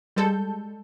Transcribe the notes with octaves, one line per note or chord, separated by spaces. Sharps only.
G3 G#3 A4 G6